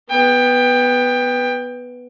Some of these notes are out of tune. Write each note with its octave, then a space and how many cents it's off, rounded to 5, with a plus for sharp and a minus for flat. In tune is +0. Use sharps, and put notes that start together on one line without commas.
B3 +0 G5 +20